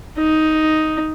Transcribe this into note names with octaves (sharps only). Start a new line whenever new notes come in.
D#4